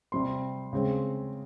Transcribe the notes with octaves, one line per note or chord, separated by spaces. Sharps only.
C3 G3 C4 C6
C#3 G#3 C4